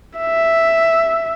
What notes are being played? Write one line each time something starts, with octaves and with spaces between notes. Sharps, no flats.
E5